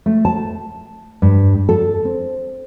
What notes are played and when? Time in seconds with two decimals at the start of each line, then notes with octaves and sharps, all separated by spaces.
0.06 A3
0.25 A5
1.22 G2
1.69 A4
2.05 C4